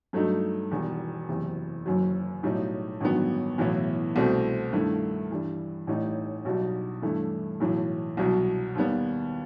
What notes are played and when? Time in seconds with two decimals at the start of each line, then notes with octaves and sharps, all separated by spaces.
0.13 G2 F#3 A3 D#4
0.71 E1 E2 D#3 G3
1.28 F#1 E2 C3
1.86 F#1 F#2 D#3 F#3
2.43 B1 A2 G3 D#4
3.01 A1 G2 D#3 F#3 B3
3.58 B1 A2 E3 B3 E4
4.16 C2 B2 A3 C4
4.73 G2 D#3 A3 E4
5.30 G2 E3 G3
5.87 A1 A2 G3 D#4
6.45 B1 B2 G3 D#4
7.02 G2 E3 A3 E4
7.60 B1 A2 E3
8.17 C2 B2 F#3
8.75 D#2 D#3 G3 B3